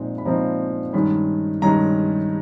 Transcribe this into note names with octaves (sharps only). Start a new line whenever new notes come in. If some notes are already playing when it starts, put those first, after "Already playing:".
Already playing: A#2 F3 G#3 C4 D#4
B5
A#2 F3 G#3 C4 D#4 A#5
G2 D#3 G#3 C#4 B5
G2 D#3 G#3 C#4 A#5